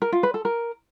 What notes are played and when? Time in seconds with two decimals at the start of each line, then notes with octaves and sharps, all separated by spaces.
0.02 A#4
0.12 F4
0.23 B4
0.34 A4
0.45 A#4